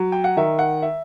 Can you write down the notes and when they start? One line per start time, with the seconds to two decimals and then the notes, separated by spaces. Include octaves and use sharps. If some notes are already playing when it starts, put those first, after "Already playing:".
Already playing: F#3
0.12 G5
0.24 F#5
0.37 D#3 E5
0.59 F#5
0.82 E5